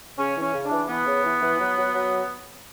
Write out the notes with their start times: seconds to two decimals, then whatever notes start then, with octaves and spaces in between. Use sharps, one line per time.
0.18 C#3 C#4
0.35 E3
0.41 C#4
0.53 C#3
0.65 D4
0.71 E3
0.88 E3 B3
1.06 C#3
1.24 E3
1.41 E3
1.59 F#3
1.77 F#3
1.94 F#3